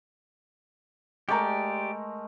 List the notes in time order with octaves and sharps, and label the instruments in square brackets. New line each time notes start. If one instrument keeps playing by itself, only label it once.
[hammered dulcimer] G#3 A3 A#4 [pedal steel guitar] G4 D5 [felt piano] A#5 C#6 G6